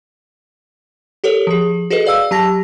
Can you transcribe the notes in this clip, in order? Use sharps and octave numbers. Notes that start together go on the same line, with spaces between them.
G4 A4 A#4 C#5
F3 G#4
F#4 G#4 A4 B4 D#5
G#4 D5 F5 E6
F#3 G4 A5 A#6